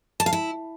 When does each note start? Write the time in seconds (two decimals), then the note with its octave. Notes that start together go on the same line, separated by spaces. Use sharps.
0.20 A5
0.26 F5
0.33 E4